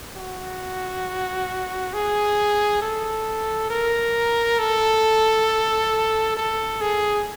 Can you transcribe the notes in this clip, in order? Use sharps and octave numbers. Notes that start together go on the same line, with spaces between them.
F#4
G#4
A4
A#4
A4
A4
G#4